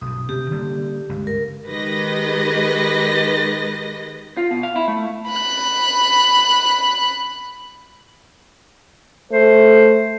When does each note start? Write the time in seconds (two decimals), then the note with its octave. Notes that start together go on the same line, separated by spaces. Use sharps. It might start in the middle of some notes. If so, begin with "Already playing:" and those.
0.01 B1 G2 D#6
0.29 D2 C3 B3 G4
0.51 D3 G3 A#3
1.09 G1 C#2
1.27 A#4
1.66 D#3 G#3 G4 B4 D#5 A#6
4.37 F4
4.51 B2
4.63 F5
4.76 E4
4.88 A3
5.29 B5 F#6
9.32 A3 C5